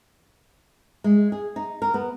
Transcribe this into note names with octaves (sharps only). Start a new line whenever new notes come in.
G#3
G#4
D#4
A#4
B3